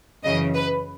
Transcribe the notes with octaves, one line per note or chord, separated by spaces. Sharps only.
F#2 C#3 E3 D#5
B4